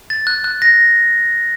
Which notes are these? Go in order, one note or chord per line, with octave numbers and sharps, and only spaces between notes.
A6
F#6
F#6
A#6